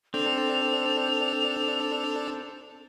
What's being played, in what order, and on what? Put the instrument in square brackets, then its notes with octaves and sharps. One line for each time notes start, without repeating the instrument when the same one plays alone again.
[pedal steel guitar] C4 [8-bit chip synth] D4 A4 [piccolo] F7